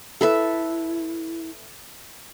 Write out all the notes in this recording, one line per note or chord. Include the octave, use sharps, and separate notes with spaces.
E4 A4 B4 E5